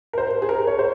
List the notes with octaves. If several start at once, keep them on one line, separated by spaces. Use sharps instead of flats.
A#4
C5
G#4
A#4
C#5
C5